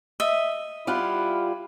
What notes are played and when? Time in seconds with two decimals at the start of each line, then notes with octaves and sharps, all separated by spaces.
0.20 D#5 E5
0.87 G3 E4 F4 F#5